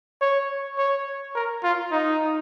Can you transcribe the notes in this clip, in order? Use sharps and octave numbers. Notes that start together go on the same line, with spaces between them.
C#5
C#5
A#4
F4
D#4